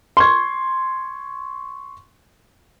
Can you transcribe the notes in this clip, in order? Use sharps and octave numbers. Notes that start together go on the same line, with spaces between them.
C6 C#6 G#6